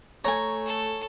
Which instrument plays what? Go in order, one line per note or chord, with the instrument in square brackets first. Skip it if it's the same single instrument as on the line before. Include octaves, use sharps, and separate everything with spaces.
[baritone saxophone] A3 [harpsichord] C#5 [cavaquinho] G#5 A#5
[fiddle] A4